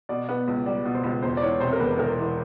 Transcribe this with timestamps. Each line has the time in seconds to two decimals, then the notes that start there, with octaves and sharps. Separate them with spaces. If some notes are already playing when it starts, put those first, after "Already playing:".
0.09 B2 D5
0.29 B3
0.48 C#2
0.66 G3 D5
0.85 B2
0.95 C5
1.04 C#2
1.22 E1 C5
1.37 D5
1.42 E2 C#5
1.60 C3 C5
1.72 A#4
1.80 E1 B4
1.98 E1 A#4
2.18 E2